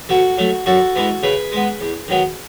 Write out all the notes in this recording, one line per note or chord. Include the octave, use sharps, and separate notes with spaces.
B2 F#4 A4
F#3 A3
F#2 F#4 A4
E3 G#3 B3
C#3 G#4 B4
G#3 B3
E2
D#3 F#3 B3